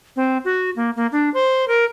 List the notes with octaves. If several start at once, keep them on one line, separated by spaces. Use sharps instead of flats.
C4
F#4
A#3
A#3
D4
C5
A#4